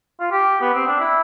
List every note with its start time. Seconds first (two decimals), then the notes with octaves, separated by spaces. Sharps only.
0.20 F4
0.32 G4
0.61 B3
0.74 C4
0.87 D4
1.00 E4